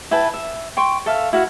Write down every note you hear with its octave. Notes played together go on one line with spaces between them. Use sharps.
E4 B4 G5 A5
E5
G5 C6 C#6
A4 E5 F5
E4 F#4 F5 F#5